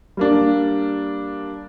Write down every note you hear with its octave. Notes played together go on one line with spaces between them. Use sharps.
G3 A#3 D4